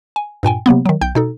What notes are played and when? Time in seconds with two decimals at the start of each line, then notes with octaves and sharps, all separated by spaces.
0.16 G#5
0.43 G2 A#2 G5 G#5
0.66 C3 F#3 A#3 B3
0.86 D#3 F#3
1.01 B1 G5 G6
1.15 B2 D#4 A4